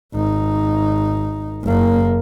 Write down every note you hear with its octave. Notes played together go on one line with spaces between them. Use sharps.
G#1 D#4
F#1 A#3